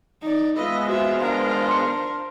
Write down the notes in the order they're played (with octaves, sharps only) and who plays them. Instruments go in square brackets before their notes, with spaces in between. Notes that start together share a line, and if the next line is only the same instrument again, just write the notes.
[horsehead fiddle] D#4 D5
[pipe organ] G#3 B3 [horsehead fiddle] F4 B4 [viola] D#5 E5
[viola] F4 C5 [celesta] F#4 [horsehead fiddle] E5
[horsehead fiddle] D4 A#4 [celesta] F5
[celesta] C6 C#7